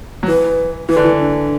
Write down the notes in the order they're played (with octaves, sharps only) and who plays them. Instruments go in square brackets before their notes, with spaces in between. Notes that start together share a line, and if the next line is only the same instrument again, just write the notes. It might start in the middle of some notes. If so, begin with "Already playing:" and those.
[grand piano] F#3
[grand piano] E3 [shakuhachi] B4
[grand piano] E3 [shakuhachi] B4
[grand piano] D3
E3
[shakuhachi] D4